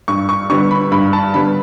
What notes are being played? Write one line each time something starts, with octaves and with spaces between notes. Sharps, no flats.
G2 C#6
C#6
D3 G3 B3 C#6
B5
G2 B5
A5
D3 G3 B3 B5